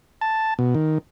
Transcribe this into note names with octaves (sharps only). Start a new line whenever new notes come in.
A5
B2
D#3